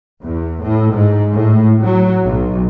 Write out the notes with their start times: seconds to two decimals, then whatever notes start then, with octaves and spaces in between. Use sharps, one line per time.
0.23 E2
0.61 A2
0.93 G#2
1.34 A2
1.83 F#3
2.27 B1